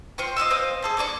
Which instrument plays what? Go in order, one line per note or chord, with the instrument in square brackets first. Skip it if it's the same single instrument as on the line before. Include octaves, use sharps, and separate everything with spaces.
[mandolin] F4 C5 G5 C#6
D#5 F5 C6 E6
C4 C5 D#5 F5
G#4 A4 C5
A#3 D4 D5 C#6